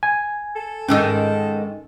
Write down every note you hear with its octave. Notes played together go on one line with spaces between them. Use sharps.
G#5
A4
G#2 D#3 C#4 D#4 E6